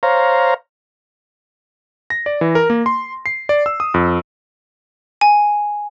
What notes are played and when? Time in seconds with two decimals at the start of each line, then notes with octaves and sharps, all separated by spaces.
0.03 C5 C#5 F5 A#5
2.10 A#6
2.26 D5
2.41 E3
2.55 A#4
2.70 A#3
2.86 C6
3.26 C7
3.49 D5
3.66 E6
3.80 D#6
3.94 F2
5.21 G#5